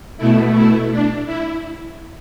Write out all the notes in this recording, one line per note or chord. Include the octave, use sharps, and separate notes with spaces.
B2 A3 E4
E4
D4
E4